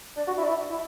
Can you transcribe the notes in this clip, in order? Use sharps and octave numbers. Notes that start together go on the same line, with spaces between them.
D4
F#4
E4
D4
E4
E4